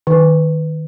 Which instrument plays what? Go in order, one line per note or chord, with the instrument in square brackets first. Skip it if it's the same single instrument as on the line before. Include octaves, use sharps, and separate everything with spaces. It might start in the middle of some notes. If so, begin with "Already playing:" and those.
[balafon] D#3